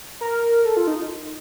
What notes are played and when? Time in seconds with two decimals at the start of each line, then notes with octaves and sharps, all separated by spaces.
0.21 A#4
0.65 A4
0.77 F4
0.87 D#4